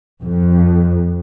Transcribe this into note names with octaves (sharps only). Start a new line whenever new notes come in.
F2